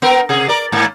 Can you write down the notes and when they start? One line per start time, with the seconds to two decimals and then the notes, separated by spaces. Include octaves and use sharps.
0.02 B3 A#4
0.29 C3 G#4
0.48 A#4 D5
0.72 G#2 A#3